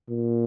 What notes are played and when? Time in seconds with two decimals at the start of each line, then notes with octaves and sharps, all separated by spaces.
0.09 A#2